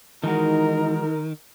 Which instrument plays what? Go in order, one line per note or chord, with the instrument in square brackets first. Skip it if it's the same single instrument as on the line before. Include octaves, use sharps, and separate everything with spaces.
[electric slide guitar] D#3 [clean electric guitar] E3 G#3 F#4 [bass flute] D#4 [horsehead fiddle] A#4